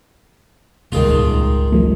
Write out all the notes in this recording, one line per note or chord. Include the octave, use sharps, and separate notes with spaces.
D#1 G#1 C#2 D#3 G#3 F4
E1 F3 A3